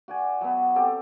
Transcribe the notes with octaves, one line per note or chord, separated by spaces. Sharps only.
F#4 D5 G#5
F#3 B3
C4 G4 A4